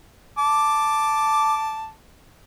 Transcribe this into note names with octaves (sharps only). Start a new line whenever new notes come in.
A5 D6